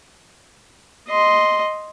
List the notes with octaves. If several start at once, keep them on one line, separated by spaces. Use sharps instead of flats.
D#5 C6